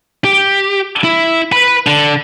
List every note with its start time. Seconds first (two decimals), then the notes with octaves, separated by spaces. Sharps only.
0.24 G4
1.04 E4
1.52 B4 B5
1.87 D3